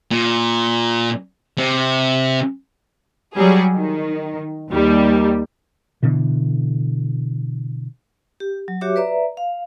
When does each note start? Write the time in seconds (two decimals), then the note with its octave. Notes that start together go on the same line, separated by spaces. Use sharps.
0.11 A#2
1.58 C3
3.36 F#3 G3 G#4
3.74 D#3
4.72 D#2 G3
6.03 B2 D3 E3
8.40 G4
8.68 F#3
8.81 F#4 G4 C#5 E5 D6
8.96 B4 D5 E5 A#5
9.37 F5